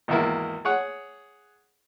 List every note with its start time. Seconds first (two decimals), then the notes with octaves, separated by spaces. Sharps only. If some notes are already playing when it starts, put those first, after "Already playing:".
0.08 G#1 E2 A#3 E4
0.65 G#4 C#5 F#5